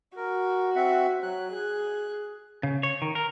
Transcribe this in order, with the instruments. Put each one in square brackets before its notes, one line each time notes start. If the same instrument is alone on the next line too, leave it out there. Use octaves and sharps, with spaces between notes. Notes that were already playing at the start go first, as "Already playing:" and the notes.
[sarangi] F#4 [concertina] A#4
[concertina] C4 E5 F#5
[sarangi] F#3 [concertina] F#6
[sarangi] G#4
[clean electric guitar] C#3
C#5
D#3
A#4